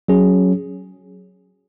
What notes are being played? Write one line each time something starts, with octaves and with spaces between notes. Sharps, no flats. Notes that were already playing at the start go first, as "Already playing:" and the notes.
F#3 C#4 G#4